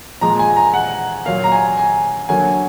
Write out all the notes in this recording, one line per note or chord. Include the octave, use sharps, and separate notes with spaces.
A#2 F3 G#3 A#5
G#5
A#5
F#5
A#2 F#3 A#3 F5
A#5
G#5
G#5
D3 F#3 A#3 G#5